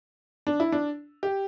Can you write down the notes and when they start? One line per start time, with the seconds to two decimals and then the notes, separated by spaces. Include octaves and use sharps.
0.47 D4
0.60 E4
0.72 D4
1.23 G4